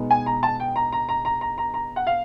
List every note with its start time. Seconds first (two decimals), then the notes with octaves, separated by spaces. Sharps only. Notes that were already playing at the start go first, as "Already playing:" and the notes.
Already playing: B2 G#3 B3 D#4
0.11 G#5
0.26 A#5
0.43 A5
0.60 G5
0.76 A#5
0.92 A#5
1.09 A#5
1.25 A#5
1.41 A#5
1.58 A#5
1.74 A#5
1.96 F#5
2.07 F5